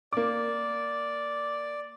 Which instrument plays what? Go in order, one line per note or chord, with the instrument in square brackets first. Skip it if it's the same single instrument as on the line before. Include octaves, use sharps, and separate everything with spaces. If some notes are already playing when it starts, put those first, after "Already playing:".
[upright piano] A#3 D6 [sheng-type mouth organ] D5